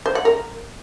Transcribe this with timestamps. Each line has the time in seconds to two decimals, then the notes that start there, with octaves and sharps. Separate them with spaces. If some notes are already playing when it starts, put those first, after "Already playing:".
0.06 C5
0.15 F#5
0.25 A#4